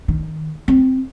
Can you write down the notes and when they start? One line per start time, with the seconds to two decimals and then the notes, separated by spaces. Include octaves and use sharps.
0.08 D#3
0.68 C4